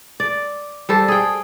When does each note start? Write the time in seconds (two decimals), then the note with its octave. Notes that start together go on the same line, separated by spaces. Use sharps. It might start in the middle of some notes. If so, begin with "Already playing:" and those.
0.20 D5
0.89 G3 A4 C5
1.08 G#4 G5